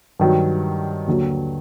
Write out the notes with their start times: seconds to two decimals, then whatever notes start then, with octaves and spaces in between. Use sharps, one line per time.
0.19 G2 D#3 F#3
1.07 D#2 D3 F#3